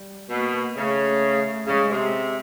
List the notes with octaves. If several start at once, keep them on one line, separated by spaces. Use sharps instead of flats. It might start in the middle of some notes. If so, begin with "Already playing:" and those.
Already playing: G3
B2 A#3
C#3 A3
C#3 G#3
C3